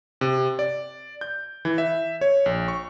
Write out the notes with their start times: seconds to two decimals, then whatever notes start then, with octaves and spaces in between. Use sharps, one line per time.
0.21 C3
0.59 D5
1.21 G6
1.65 E3
1.78 E5
2.21 C#5
2.46 A#1
2.68 C#6